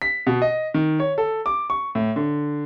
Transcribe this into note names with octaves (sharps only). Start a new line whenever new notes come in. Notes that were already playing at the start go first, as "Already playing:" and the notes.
B6
B2
D#5
D#3
C#5
A4
D6
C#6
A2
D3